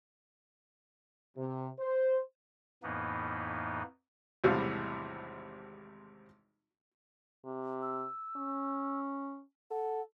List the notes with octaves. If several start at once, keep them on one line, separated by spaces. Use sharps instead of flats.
C3
C5
F2 A2 E3 A#3 B3 D#4
G#1 E2 A2 C3 G3 F5
C3
E6
C#4
A4 F#5